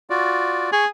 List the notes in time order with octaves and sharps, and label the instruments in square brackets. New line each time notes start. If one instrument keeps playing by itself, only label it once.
[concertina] F4 F#4 D5
[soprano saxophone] G#4 [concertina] C#6